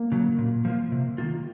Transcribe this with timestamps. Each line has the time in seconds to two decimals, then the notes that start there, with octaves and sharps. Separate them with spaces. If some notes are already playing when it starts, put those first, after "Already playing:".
Already playing: A#3
0.12 C#3 F#3
0.38 A#2
0.65 F3 A#3 F4
0.92 C3
1.18 D#3 A#3 F4